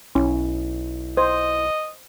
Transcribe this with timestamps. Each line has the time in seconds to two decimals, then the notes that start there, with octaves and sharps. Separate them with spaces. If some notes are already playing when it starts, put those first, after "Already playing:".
0.15 B1 C#4 E4
1.17 C5 D#5